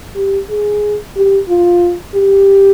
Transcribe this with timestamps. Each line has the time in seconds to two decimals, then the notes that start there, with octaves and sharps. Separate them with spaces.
0.16 G4
0.50 G#4
1.16 G4
1.49 F4
2.14 G4